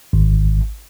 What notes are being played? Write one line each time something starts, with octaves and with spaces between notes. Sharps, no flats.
G#1